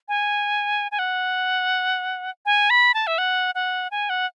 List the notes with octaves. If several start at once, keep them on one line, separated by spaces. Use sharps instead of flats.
G#5
G#5
F#5
G#5
B5
A5
E5
F#5
F#5
G#5
F#5